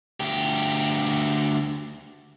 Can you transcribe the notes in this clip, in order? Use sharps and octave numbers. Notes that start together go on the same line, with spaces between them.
D2 G4